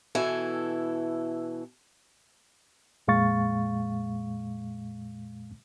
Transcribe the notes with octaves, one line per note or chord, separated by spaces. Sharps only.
B2 E3 E4 A4 G#5
F2 A#2 G#3 F5 C#6 A6